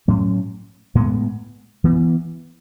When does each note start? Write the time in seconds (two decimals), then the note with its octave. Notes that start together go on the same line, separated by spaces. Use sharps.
0.08 A2 F#3 A3 C#4
0.95 A2 G#3 B3
1.84 E3 B3